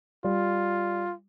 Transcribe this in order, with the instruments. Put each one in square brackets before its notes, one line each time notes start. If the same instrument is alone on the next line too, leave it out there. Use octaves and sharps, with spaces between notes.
[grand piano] G3 [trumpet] F4